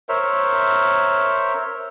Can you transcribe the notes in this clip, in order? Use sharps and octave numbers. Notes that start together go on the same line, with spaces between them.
A#4 C5 C#5 E5